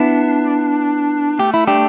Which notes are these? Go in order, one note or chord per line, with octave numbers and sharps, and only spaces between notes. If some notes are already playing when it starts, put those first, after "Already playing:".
Already playing: B3 D4 E4
A3 G4
E4
D4 G4